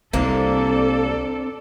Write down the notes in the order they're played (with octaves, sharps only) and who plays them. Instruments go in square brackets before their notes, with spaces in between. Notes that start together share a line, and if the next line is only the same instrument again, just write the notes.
[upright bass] C2 [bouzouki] C3 A#3 [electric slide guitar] C4 D4 [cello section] A4 D5